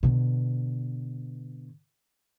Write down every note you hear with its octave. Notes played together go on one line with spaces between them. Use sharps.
B2 D3